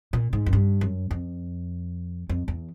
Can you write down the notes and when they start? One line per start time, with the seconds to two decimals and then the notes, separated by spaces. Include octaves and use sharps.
0.13 A#2
0.33 G#2
0.46 F#2
0.53 G2
0.81 F#2
1.11 F2
2.29 F2
2.48 E2